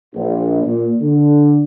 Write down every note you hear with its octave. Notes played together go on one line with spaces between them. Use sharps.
A#1
A#2
D3